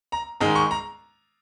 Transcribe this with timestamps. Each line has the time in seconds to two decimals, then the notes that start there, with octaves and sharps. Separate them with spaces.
0.12 A#5
0.40 G#2 D#3 G#3
0.55 C#6
0.71 A#5